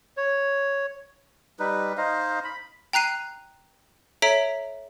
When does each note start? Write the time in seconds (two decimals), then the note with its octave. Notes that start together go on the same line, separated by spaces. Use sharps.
0.17 C#5
1.59 G3 D#4 B4
1.97 D#4 C5 D#5 F5
2.44 B5
2.93 G5 A#5 F#6 C7 D#7
4.22 A4 C#5 E5 A#5 B6 D7